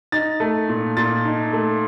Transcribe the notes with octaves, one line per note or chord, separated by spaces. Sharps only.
D#4 A6
A3
A#2
A#2 A6
D#4
A3